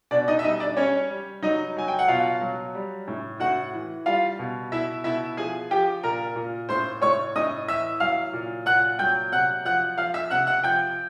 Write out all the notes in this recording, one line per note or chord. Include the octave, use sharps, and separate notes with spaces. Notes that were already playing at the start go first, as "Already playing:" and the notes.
B2 D4 D5
D#4 D#5
E5
G3 D#4 D#5
D4 D5
G3 C#4 C#5
G3
F#3 D#4 D#5
F#3 G#5
G5
F#5
B2 F4 F5
F#3
G3
A2
A2 F#4 F#5
E3
G3 F4 F5
B2
B2 E4 E5
B2 E4 E5
F3 G#4 G#5
F3 G4 G5
A#2 A#4 A#5
A#2
A2 C5 C6
A2 C#5 C#6
A2 D#5 D#6
E3 E5 E6
F#3 F5 F6
A#2
A#2 F#5 F#6
F#3 G5 G6
C3 F#5 F#6
F3 F#5 F#6
F3 F5 F6
E5 E6
C3 F#5 F#6
F#5 F#6
F3 G5 G6